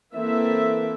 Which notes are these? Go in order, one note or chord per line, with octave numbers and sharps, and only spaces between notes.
E3 A#3 C4 A4 E5